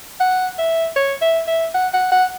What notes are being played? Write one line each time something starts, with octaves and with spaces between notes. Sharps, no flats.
F#5
E5
C#5
E5
E5
F#5
F#5
F#5